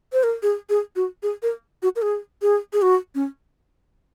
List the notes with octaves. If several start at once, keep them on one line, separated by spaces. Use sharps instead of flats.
C5
A#4
G#4
G#4
F#4
G#4
A#4
F#4
A#4
G#4
G#4
G#4
F#4
C#4